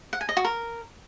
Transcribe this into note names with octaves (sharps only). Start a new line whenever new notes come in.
F#5
G#5
D#5
F#4
A#4